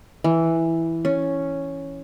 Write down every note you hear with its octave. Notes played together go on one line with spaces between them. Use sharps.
E3
C#4